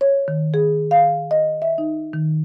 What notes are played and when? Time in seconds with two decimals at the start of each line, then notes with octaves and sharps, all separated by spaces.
0.01 C#5
0.28 D#3
0.54 G#4
0.91 F5
1.31 D#5
1.62 E5
1.78 D#4
2.13 D#3